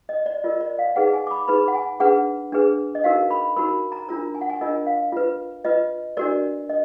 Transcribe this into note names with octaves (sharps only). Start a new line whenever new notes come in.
D#5
D5
F4 A#4 D#5
D5
F5
D#4 G#4 B4 F#5
G#5
D6
B5
D#4 G#4 B4 B5
F#5
G#5
D4 G#4 B4 F#5
D4 G#4 B4
D#5
D#4 F#4 A#4 F5
B5
D#4 F#4 A#4 B5
A#5
D4 F4 A#4 A#5
G#5
F#5
G#5
D4 F4 A#4 D#5
F5
F4 B4
F4 B4 D#5
D4 F#4 A#4 D5
D#5